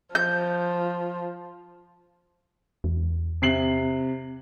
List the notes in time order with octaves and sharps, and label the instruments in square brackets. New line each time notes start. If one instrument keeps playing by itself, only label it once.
[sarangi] F3 [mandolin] G6
[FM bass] E2
[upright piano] C3 C7 F#7